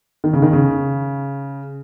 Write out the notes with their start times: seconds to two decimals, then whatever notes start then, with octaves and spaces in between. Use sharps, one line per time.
0.24 D#3
0.33 C#3
0.42 D#3
0.53 C#3